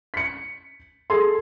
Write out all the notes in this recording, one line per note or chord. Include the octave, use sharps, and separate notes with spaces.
B6 C#7
G#4 A4 C6